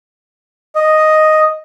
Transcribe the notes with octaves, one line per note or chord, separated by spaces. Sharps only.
D#5